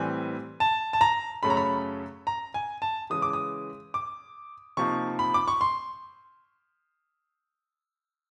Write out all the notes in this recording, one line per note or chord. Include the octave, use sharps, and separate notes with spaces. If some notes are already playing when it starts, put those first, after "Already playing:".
Already playing: A2 E3 G3 C4 G#5
A5
A5
A#5
F#2 C#3 F#3 A3 C#4 B5
A#5
B5
A#5
G#5
A5
C#3 E3 G#3 D#6
D6
D#6
D6
C3 F3 A#3 D#4 C#6
B5
D6
C#6
C6